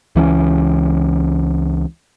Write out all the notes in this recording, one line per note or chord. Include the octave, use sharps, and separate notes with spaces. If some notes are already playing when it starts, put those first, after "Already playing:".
C#2 E3 F3 C#4